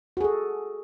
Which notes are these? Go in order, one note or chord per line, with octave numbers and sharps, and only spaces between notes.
F#4 G#4 A4